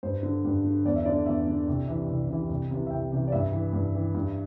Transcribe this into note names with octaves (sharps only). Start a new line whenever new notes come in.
G2 C5
D3
G2
D3
E2 D5
E5
D3 D5
E2 E5
D3
C2
C3 E3
C2
C3 E3
C2
C3 E3
E5
C2 G5
C3 E3
D5
G2 E5
E3
G2
E3
G2